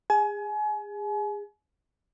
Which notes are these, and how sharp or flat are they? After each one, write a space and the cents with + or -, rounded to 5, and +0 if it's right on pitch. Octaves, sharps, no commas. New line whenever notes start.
G#4 -25 G#5 +35